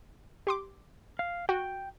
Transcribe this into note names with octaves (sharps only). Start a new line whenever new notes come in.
G4 C6 D6
F5
F#4 G5